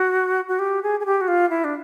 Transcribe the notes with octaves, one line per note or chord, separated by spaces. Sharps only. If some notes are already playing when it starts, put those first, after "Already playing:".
Already playing: F#4
F#4
G4
G#4
G#4
G4
F#4
F4
E4
D4